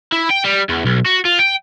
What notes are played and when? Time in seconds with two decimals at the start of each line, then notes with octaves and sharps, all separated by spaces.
0.13 E4
0.31 G5
0.45 G3
0.69 E2
0.86 B1
1.06 F#4
1.25 F4
1.39 G5